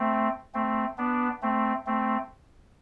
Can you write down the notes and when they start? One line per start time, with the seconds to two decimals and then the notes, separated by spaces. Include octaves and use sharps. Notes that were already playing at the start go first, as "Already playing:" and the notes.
Already playing: A3 C4
0.54 A3 C4
0.98 B3 D4
1.42 A3 C4
1.86 A3 C4